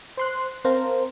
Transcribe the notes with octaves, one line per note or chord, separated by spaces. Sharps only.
C5 C6 F#6
C4 A#4 C5 F5 A5 A#5